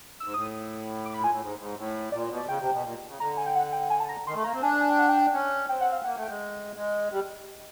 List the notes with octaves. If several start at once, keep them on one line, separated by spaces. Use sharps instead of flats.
G#2 E6
A2 D#6
D6
B5
A#2 G#5
A2
G#2
G#2
A2
A#2 D5
B2
D5
C#3 G5
C3
B2
A#2
C#3
D3 A#5
G#5
G5
F#5
G5
G#5
A5
A#5
D#3 C6
A3
A#3 A#5
C4
D4 G#5
G#5
G5
F#5
G5
C#4
C4 G5
F#5
F5
A#3 F#5
A3
G5
G#3
G#3
G3